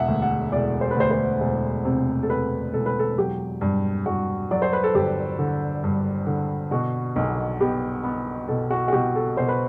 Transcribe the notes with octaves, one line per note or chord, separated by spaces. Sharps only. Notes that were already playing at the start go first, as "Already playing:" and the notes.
Already playing: E1 E5 F#5
D2
F#5
E1 D5
C5
B4
D2 C5
C5
E1
C3
A4
C3 B4
E1 A4
B4
A4
F#3 G4
G2
G2 F#4
F#3 D5
C5
B4
A4
G1 G4
D3
G2
D3
B2 F#4
B1
B3 G4
B3
B2 A4
F#4
F#4
B2 G4
A4
B2 C5
B4